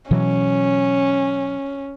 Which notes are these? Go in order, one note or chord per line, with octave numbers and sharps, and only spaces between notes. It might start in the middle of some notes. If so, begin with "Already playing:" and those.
B2 E3 F#3 C#4